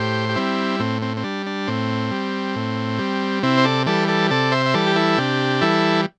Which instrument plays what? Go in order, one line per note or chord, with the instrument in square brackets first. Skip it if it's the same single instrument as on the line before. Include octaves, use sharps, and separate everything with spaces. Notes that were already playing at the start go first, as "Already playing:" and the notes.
Already playing: [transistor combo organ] A2 G4 C5
G4
G3 C4 E4
A2 C4
C4
C4
G3 D4
D4
A2 C4
G3
A2
G3
C3 C4 E4
C5
A4 D5
E3 G3 A4 D5
A4 D5
C3 A4 D5
C5 E5
E5
E3 G3 A4 D5
G4
E4 A4
C3 D4 G4
E3 G3 E4 A4